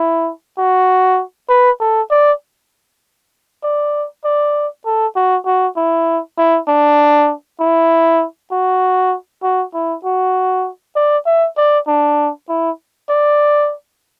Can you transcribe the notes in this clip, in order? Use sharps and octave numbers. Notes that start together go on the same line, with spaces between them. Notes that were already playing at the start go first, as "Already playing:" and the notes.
Already playing: E4
F#4
B4
A4
D5
D5
D5
A4
F#4
F#4
E4
E4
D4
E4
F#4
F#4
E4
F#4
D5
E5
D5
D4
E4
D5